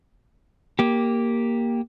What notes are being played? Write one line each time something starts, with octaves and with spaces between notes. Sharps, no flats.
A#3 G4